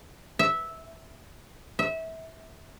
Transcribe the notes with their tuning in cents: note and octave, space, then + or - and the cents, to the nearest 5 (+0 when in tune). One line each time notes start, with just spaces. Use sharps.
E5 -10
E5 -25